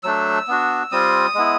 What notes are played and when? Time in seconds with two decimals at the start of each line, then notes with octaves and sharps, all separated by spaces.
0.03 F#3 A3 D4 E6
0.48 B3 D4 F#4
0.92 G3 C4 F4 D#6
1.35 G#3 B3 E4